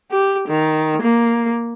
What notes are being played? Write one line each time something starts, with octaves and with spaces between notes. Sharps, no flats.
G4
D#3
A#3